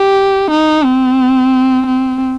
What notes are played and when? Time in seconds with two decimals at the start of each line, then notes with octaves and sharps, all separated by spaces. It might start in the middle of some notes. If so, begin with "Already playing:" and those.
Already playing: G4
0.51 D#4
0.85 C4
1.87 C4